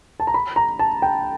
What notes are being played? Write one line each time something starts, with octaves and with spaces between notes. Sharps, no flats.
A5
A#5
B5
A#5
A5
G5